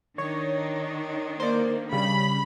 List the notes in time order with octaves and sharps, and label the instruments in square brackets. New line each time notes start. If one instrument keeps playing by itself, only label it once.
[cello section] D#3 D4 D#4 [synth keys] C#5
[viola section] A#3 [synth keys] C5 D5
[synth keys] C#3 G3 [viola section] B5